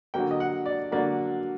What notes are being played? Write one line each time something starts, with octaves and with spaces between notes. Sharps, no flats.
D3 F#3 A#3 G5
D#5
F#5
D5
D3 F#3 A#3 D5